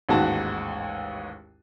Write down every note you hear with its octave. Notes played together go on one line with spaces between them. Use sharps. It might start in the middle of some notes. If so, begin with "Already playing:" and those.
A1 D#2 G#2 F#4 A5